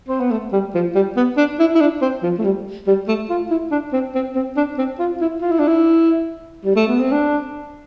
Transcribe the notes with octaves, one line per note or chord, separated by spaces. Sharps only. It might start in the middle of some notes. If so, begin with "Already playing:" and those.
C4
B3
A3
G3
F3
G3
B3
D4
E4
E4
D4
C4
F3
A3
G3
G3
A3
F4
E4
D4
C4
C4
C4
D4
C4
F4
E4
F4
E4
D4
E4
G3
A3
B3
C4
D4